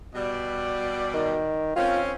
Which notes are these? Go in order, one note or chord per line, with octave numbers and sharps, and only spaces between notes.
B2 G3 D5
D#3
C4 C#4 F4